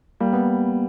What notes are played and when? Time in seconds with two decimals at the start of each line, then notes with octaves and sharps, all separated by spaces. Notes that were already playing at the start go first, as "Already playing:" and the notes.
0.20 G3 A#3
0.33 B3